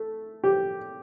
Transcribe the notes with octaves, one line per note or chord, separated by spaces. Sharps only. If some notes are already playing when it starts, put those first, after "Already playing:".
Already playing: A3
G4